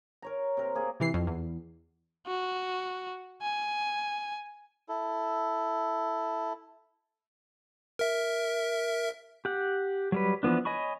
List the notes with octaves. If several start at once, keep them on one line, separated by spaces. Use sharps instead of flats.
A#4 C#5 A#5
C3 A#4
A#3 G#4
C3 E3 C7
F2
E2
F#4
G#5
E4 A4
A#4 E5
G4 F#5
F#3 G3 B4
E3 F3 B3 D4
C#5 D#5 G#5 B5 C#6